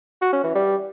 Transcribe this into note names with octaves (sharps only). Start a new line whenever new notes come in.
F#4
C#4
E3
G3